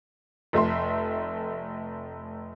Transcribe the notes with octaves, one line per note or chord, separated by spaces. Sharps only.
F1 A3 E5 C6